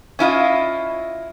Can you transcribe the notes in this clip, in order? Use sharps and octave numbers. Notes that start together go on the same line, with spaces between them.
C#4 E4 F4 D#5